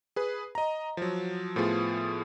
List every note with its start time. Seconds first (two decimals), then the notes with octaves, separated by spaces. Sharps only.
0.16 G#4 B4
0.55 D#5 A#5
0.97 F3 F#3
1.56 A2 F3 B3 F4 G#4